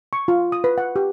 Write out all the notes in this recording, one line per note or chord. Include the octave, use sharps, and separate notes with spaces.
C#6
F4
D#6
B4
F#5
G4